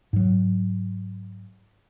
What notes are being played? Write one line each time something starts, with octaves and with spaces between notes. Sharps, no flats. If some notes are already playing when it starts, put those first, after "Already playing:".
G#2 F#3